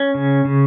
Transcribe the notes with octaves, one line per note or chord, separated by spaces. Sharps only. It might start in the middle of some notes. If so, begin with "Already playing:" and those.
Already playing: C#4
C#3
C#3